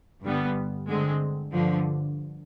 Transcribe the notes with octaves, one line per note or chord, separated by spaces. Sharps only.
G2 D3 G3 B3
D3 G#3 C4
G2 D3 F3